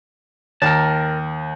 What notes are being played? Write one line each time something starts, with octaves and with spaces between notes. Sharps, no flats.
D#2 A#4 A5